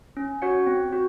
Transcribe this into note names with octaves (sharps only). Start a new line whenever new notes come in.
C#4
F#4 C#5 F#5
C4
F#4